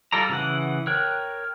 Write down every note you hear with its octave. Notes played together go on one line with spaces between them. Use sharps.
G3 F4 A4 D5 A#5
C#3 E3 F#5
A#4 C#5 G5 F#6